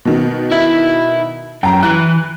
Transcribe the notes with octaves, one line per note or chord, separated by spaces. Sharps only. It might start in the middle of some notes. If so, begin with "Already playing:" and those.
B2 D#3
E4 E5
F#2 G5 A#5
E3 F#6